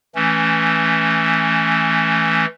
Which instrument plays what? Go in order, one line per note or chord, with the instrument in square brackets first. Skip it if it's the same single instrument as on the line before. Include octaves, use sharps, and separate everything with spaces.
[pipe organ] E3 A3 C#4